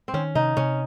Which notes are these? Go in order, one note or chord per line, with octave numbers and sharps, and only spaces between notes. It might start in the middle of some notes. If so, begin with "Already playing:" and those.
C4
D#3 C#4
C3 D#4
C3 C#4